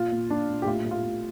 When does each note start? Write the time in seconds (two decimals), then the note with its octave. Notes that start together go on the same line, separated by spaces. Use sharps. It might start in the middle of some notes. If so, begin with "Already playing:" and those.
Already playing: A#2 F4
0.12 A#2
0.29 A#2 D4
0.49 A#2
0.62 G4
0.66 A2 F4
0.85 A2
0.91 F4
1.03 A2